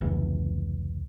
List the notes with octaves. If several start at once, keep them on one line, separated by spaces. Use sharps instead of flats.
F1 C#2 E3